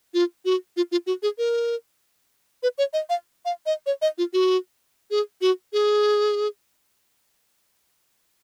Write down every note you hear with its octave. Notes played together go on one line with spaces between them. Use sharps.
F4
F#4
F4
F4
F#4
G#4
A#4
B4
C#5
D#5
F5
F5
D#5
C#5
D#5
F4
F#4
G#4
F#4
G#4